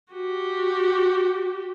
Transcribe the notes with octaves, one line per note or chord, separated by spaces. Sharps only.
F#4 G4